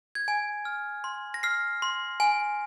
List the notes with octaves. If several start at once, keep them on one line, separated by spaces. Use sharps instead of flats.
G#6
G#5
F6
C6
A#6
F6 C7
C6
G#5